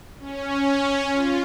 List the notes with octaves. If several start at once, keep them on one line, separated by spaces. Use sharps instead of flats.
C#4
F4